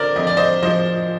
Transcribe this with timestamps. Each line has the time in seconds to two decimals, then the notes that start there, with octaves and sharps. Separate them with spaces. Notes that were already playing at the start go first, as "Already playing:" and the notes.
Already playing: D3 A#4 C5 D5
0.16 F2 D#5
0.27 D5
0.37 C5 D#5
0.62 F3 C5 D#5